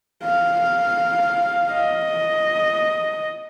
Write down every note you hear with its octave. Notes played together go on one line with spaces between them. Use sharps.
F5
D#5